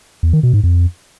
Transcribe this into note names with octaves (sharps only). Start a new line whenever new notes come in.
E2
D#3
B2
G#2
F2